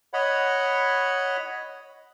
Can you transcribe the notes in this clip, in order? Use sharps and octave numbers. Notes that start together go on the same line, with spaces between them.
C#5 D#5 F#5 B5